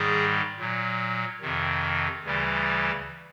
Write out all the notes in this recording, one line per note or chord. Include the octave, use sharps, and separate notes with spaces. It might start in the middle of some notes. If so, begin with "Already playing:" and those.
Already playing: G#2 D#3 G3 G#4
A#2 F#3
F2 C3 D#3
D2 C#3 E3 G3